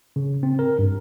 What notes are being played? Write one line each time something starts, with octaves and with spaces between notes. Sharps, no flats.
C#3
C4
A#4
G2